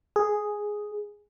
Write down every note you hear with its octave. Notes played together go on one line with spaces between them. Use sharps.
G#4